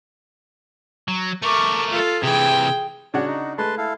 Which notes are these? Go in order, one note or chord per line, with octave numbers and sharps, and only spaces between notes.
F#3
A3 A#4 C#6 D6
F4 A4
C3 E3 G#4 G5
C#3 D4 F#4 C#5
D#4
G#3 A3 B4 A5 C6
E4 A4 F5